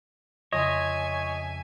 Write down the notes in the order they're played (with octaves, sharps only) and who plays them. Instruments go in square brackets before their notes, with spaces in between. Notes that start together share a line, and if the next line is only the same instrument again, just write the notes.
[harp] F2 C#3 C6 [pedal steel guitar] C#5 [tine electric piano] D#5 [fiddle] E5 G#5